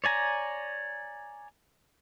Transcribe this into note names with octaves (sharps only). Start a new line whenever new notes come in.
C#5 D5 G#5 A#5